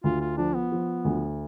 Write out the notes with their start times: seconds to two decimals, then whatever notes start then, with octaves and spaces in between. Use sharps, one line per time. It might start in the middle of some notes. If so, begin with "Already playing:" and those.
0.04 D2 F4
0.21 F4
0.37 F3 D4
0.55 B3
0.72 F3
1.05 D2